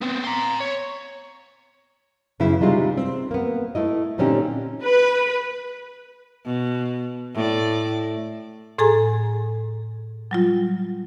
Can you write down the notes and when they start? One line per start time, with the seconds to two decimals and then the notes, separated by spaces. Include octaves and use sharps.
0.02 B3 C4
0.25 A#5 C6
0.61 C#5
2.40 F#2 C#3 B3 E4
2.61 C3 G3 G#3 D#4 F4
2.97 C4
3.31 A#3 B3
3.75 A3 E4 D#5
4.18 A#2 D3 C4 C#4 D#4 G4
4.83 B4
6.45 B2
7.34 A2 D5
8.78 A2 G#4 A4 G#5 A#5
10.31 F#3 G3 F4